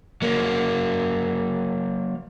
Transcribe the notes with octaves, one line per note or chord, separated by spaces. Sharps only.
F#3 A#3